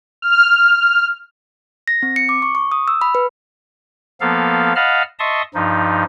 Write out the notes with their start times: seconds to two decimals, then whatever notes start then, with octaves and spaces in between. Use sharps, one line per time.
0.22 F6
1.88 A#6
2.03 C4
2.16 C#7
2.29 D6
2.42 C#6
2.55 C#6
2.72 D#6
2.88 E6
3.01 B5
3.15 B4
4.21 F3 A#3 B3 A4 F5
4.76 D#5 F5 F#5 A5 B5 F6
5.19 D#5 E5 A5 C6 C#6 D#6
5.54 G2 F3 D#4